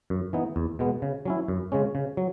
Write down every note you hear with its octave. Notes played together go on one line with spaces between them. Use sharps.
F#2
E3 B3 D#4
E2
B2 G#3 B3
C#3
F#3 C#4 E4
F#2
C#3 G#3 C#4
C#3
F#3